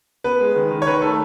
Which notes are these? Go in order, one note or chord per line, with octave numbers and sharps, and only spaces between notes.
B3 B4
G#3
D#3
D#3
C#5
D#3 B4
A3 A4